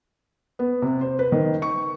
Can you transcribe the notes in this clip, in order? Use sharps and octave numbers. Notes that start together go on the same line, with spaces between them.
B3
C3
C5
B4
D#3
C#6